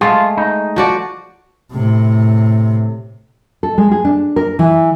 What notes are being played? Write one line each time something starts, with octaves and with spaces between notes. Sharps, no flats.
G#3 A3 F4
D#4
F3 F#4 D5
A2 C3
A4
G#3
G#4
D4
A#4
E3